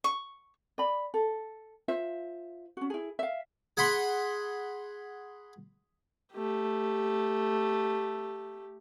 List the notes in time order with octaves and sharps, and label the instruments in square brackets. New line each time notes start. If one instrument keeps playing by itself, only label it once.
[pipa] C#6
[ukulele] D5 B5
A4
F4 C5 E5
C#4 F#4
E4 G#4
E5 F5
[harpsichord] G#4 F#5 B5 C6
[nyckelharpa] A3 G4